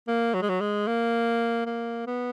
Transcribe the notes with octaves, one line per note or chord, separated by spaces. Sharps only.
A#3
F#3
G#3
F#3
G#3
A#3
A#3
B3